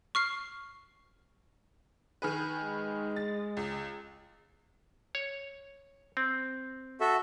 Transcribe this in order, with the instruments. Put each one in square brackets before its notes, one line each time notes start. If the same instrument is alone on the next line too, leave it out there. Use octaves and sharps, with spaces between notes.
[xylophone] C#6 F6 C7
[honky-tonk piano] D#3 G#4 B4
[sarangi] G#3
[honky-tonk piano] A6
C#2
[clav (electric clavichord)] C#5
C4
[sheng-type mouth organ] F#4 A4 E5